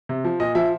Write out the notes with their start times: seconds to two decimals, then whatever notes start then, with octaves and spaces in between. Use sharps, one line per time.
0.09 C3
0.25 F3
0.40 A#2 D#5
0.55 F3 E5